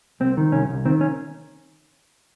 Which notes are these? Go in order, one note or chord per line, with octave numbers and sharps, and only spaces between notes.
C2 C4
D#3
C2 C#4
C2
D#3 C4
C#4